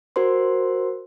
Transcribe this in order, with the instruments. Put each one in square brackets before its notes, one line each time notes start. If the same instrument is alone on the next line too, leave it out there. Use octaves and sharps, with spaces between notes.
[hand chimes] F#4 A#4 C5 C6